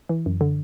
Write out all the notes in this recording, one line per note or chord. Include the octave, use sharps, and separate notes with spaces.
E3
F#2
D3